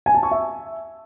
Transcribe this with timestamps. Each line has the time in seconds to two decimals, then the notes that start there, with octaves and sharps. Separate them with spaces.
0.06 G#5
0.15 A5
0.23 C#6
0.31 E5